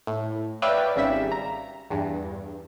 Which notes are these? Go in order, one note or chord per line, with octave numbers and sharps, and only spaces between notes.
A2
B4 C#5 D5 E5 F5 G5
G#1 C#3 G3 E5 E7
A#5
E2 G2